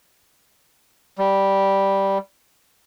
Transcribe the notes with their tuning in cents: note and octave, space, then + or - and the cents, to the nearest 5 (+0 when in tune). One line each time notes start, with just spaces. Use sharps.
G3 -5